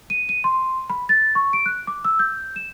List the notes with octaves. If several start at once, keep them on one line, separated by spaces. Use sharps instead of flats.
D#7
D#7
C6
B5
A6
C#6
D7
F#6
D6
E6
G6
E7